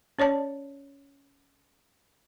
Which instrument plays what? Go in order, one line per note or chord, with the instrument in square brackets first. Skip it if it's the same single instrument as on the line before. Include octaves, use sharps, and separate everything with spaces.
[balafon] C#4 C#5 D5 A5